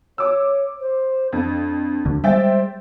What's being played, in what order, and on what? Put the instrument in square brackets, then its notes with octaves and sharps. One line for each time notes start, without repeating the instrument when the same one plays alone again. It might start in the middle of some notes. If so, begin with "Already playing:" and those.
[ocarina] C#5 [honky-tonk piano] D6 E6
[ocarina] C5
[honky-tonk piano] F2 [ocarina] D4
[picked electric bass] D2 D3
[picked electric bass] G3 G#3 [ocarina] C5 [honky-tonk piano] E5 G5 A6